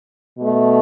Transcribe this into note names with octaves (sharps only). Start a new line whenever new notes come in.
B2 A3